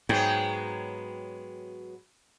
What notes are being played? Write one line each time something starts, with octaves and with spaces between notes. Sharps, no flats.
G#2 F#3 G#3 B3 G5